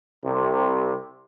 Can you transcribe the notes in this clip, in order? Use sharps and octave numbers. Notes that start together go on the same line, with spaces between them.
C2 C3